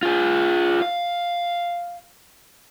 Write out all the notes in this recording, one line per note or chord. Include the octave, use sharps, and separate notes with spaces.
F4 G#4
F5